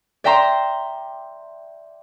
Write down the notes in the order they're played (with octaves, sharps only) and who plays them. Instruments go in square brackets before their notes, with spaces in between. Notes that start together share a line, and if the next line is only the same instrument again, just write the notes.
[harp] D5 E5 G5 A#5 C6